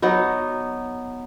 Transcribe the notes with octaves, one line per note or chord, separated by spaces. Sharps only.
F#3 B3 D#4